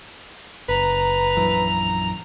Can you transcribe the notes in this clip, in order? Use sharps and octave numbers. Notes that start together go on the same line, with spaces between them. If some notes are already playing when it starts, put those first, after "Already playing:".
F#1 B4 A#5
A#1 F#2 E3